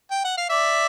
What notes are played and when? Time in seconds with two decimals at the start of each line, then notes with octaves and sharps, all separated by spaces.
0.11 G5
0.25 F#5
0.38 F5
0.50 D5 E5